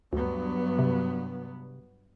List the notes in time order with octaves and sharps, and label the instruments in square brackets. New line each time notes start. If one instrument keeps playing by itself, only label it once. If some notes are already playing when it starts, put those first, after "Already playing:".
[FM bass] D2 [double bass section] G2 F#3 B3
[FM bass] C3